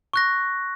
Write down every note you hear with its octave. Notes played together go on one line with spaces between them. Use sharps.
C#6 F#6 A#6